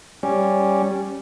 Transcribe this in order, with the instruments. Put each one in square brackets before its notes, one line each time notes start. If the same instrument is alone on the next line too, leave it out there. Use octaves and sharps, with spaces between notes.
[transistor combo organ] G3 C#4